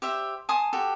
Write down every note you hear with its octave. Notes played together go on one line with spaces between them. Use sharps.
G4 C5 E5
G#5 A5 C6 D#6
F#4 G4 A4